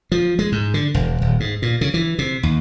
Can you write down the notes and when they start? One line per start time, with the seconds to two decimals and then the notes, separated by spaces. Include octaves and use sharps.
0.12 F3
0.39 G#3
0.52 G#2
0.74 D3
0.94 E1
1.22 D#1
1.40 G#2
1.62 A#2
1.81 C#3
1.94 E3
2.19 C3
2.43 D#2